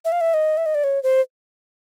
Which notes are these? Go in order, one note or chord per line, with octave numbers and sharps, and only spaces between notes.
E5
F5
E5
D#5
E5
D#5
D5
C#5
C5